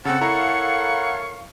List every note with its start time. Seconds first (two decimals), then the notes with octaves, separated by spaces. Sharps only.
0.05 C#3 C4 A4 F#5
0.21 E4 A4 A#4 C#5 F5 A#5 C#6